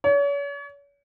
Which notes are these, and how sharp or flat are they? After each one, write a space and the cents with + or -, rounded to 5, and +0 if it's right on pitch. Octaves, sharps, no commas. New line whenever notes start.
C#5 +40